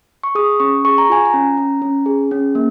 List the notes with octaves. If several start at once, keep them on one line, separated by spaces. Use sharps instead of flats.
C#6
G#4 D#6
C#4 C#6
G#4 C#6
A#5
F4 G#5
A#5
C#4
C#4
C#4
G#4
C#4
A#3